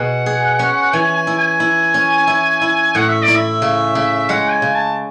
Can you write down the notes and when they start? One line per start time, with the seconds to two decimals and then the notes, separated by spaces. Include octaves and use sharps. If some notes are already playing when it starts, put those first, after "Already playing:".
Already playing: B2 G#4 F#5
0.26 G#4
0.59 C#4
0.93 E3 G#5
1.15 G#5
1.27 E4
1.38 G#5
1.60 E4
1.94 C#4
2.27 E4
2.62 E4
2.95 A2 F#5
3.08 E5
3.22 D5
3.28 E4
3.35 E5
3.62 C#3
3.95 C#3
4.29 G#3 F#5
4.51 G#5
4.62 C#3
4.74 A5